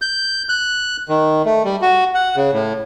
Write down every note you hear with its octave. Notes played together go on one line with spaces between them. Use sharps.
G6
F#6
D#3
A3
G3
F#4
F#5
C#3
A2